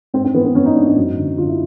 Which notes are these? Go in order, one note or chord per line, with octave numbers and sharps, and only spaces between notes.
G#2 C4
C4
E3 B3
B3
E3 C#4
D#4
G#2 D4
D#4
F#2
D3
D3 F4
E4